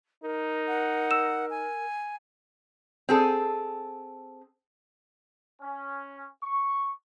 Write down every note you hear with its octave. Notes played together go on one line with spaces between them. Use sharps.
D#4 A#4
F#5
E6 E7
G#5
C4 G#4 A4
C#4
C#6